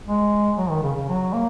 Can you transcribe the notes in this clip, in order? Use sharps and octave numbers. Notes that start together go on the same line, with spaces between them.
G#3
F#3
D#3
C#3
C#3
F#3
A#3